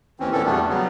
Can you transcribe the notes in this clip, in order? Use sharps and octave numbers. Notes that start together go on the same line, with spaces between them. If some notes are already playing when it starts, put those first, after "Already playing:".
D#2 E3 C4 C#4
A#2 D3 E3 C4 C#4 A4
E2 B2 G3 A3 B3 D4
C#3 F#3 G3 B3